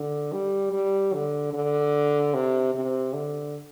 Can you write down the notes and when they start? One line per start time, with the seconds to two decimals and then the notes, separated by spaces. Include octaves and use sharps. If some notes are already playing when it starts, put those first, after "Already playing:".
Already playing: D3
0.32 G3
0.73 G3
1.13 D3
1.53 D3
2.34 C3
2.74 C3
3.13 D3